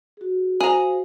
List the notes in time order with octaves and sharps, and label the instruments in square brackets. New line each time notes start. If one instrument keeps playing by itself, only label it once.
[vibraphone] F#4 G#4
[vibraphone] F#4 C5 F5 [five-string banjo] G#4 A#5